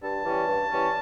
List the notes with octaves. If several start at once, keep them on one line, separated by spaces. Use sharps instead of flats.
G2 A5
E3 G3 C#4
G2
E3 G3 C#4